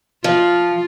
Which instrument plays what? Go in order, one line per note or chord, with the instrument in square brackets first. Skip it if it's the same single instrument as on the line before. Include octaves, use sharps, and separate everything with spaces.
[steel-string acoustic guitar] F3 [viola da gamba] F4